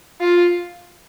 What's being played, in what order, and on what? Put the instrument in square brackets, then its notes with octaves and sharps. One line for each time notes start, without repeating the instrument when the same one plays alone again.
[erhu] F4